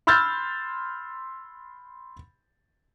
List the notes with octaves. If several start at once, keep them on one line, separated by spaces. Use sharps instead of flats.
B5 C6 E6 F6 G6 A6